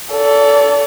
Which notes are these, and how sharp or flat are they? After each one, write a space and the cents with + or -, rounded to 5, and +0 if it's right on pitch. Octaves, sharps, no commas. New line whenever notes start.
A4 +5 D5 -40